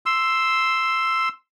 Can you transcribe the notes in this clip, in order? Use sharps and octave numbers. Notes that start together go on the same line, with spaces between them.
C6 E6